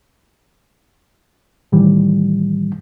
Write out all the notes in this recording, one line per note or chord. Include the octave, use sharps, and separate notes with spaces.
A2 D#3 E3 G3